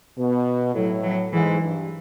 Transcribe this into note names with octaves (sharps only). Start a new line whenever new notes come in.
B2
A2 F#3
F#3
G#2 E3
G2